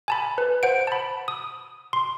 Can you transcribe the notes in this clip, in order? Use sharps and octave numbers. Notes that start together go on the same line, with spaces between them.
G#5 A5 B5
B4
C5 F#5 D7
A5 B5
D#6
C6